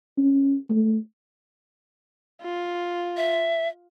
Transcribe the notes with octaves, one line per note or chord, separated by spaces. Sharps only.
C#4
A3
F4
E5